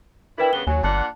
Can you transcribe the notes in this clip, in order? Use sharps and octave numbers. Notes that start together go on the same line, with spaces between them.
D4 E4 A#4 B4 G5
G2 C#3 B3 G7
D#2 F#3 C#5 G#5
G1 A#2 D4 F#5 A5